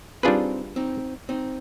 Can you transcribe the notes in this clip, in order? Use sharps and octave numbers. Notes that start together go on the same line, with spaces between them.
G3 C4 D4 D#4 F4 G#4 B4
C4 D#4
C4 D#4